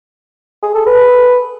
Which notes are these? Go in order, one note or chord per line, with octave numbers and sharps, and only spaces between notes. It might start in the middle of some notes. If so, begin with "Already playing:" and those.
G#4
A4
B4